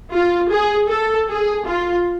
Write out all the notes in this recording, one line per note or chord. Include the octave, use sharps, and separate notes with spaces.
F4
G#4
A4
G#4
F4